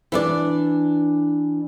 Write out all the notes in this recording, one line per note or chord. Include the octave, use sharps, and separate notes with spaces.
E3 D4 D5